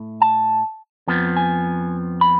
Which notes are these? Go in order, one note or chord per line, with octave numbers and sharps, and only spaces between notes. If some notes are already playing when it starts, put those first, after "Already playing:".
Already playing: A2 A3
A5
F2 F3 B3
G#5
B5